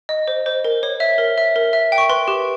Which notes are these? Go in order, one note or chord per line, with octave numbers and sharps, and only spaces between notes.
D#5
C5
C5
A#4
C#5
E5
A#4
E5
A#4
E5
G5
C#6
B4 C6
G4